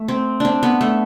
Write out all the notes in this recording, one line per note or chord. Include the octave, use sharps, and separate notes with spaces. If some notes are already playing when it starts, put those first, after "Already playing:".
Already playing: A3
C4
C4 D4
B3
A3